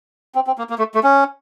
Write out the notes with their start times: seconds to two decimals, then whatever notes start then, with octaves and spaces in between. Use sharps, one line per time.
0.35 C4
0.47 C4
0.58 A#3
0.70 A#3
0.78 A3
0.95 A3
1.03 C#4